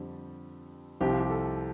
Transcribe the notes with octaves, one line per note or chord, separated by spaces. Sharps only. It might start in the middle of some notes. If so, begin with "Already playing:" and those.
Already playing: F2 D3 G3
C2 C3 F3 G4
F4
G4
A4